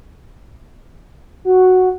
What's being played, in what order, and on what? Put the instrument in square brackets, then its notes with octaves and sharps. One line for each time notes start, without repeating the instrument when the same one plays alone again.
[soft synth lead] F#4